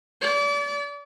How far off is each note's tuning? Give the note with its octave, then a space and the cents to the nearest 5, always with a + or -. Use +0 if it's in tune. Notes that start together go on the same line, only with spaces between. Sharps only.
D5 -35